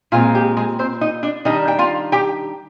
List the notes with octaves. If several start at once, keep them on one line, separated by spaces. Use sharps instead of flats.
A#2 G#3 C4 F4
G4
G#3 G#4
C4 C5
D#4 D#5
D4 D5
D#3 G3 D4 D#4 D#5
G5
F4 F5
G4 G5